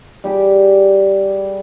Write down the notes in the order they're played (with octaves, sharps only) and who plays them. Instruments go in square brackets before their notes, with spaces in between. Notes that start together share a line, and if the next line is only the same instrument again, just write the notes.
[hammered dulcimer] G3 G4 G#4